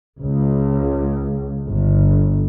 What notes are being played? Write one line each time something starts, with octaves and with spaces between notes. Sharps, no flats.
C#2
G1